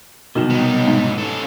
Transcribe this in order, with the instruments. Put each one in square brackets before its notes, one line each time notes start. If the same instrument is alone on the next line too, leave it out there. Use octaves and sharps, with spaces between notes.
[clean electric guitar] C2 B2 [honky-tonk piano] D#3 F#3 E7
[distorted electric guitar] B3 D#4
[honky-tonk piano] G#2
[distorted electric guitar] C#4 A4